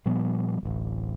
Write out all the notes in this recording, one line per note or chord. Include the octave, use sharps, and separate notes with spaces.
A#2 F3 G3 B3
D1 A1